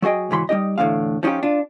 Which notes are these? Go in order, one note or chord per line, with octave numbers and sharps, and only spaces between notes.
F#3 F#4 G#4 D#5 G5
C#2 G#2 E3 F#3 B5 C6
G3 D#4 G4 D#5
E2 A2 D3 G#3 F5
F3 C#4 D#4 F4 G4
D4 F4